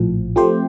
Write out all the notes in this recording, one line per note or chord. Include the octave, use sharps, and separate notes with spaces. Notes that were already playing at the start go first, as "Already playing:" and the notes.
Already playing: A#1 A2 F3
F3 A3 C4 G4 C5